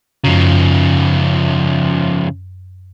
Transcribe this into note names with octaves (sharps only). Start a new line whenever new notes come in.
F#2 C#3 F3